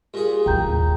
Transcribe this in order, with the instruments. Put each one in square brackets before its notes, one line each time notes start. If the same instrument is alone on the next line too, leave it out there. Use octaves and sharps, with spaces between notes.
[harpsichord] A#2 G#4 [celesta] G4
[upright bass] A2 C#4 [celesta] G5 A#5 G6
[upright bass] D#2